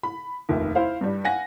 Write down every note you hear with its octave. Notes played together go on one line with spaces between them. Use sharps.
B5
F1 A#1 D#2
E4 C5 F5
G2 G3
F5 F#5 G#5 A#6